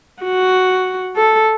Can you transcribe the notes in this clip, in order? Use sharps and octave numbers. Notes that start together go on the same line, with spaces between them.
F#4
A4